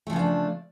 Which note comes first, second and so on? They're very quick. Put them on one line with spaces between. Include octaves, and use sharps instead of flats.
A3 F3 C#3 B3 D4